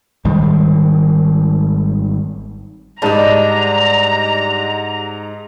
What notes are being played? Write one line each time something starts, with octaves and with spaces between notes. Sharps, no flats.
G#1 D#3 G3 G#3
G#2 G3 D4 D#5 A5 A#5